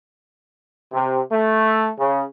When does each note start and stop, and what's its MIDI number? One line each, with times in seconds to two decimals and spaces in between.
0.93 1.19 48
1.30 1.90 57
1.97 2.23 49